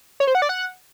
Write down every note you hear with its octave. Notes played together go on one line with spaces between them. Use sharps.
C#5
C5
F#5
D5
F#5